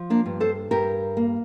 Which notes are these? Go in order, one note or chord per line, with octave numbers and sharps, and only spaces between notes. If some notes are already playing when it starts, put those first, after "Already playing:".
Already playing: F3
A#3 D4
G2
A4 C5
G2 G4 A#4
A#3